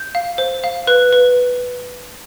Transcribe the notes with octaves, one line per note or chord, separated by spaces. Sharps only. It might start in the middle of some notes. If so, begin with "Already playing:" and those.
Already playing: G6
F5
C5
F5
B4 F#6
B4